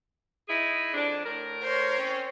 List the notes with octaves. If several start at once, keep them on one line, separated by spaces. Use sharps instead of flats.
D#4 E4 G#4
F2 D4
A2 A#4
C5 C#5
C4 C#4